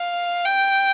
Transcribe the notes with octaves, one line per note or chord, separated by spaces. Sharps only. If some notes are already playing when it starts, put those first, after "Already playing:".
Already playing: F5
G5